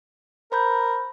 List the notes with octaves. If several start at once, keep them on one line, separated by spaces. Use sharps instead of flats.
A#4 C5 B5 G6